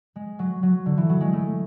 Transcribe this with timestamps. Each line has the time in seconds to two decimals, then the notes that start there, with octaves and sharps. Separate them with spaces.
0.16 G#3
0.39 F#3
0.63 F#3
0.86 D3
0.98 E3
1.09 F#3
1.21 G#3
1.33 A3